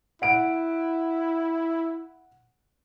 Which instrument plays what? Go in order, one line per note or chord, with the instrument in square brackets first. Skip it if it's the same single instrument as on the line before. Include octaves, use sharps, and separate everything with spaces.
[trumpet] E4 [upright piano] F#5 D7